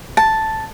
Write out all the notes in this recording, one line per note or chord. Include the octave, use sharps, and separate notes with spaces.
A5